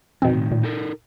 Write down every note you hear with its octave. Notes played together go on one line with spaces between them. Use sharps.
F2 B2 D#3 C4
A2 D#3
A#2
D#4 A4 A#4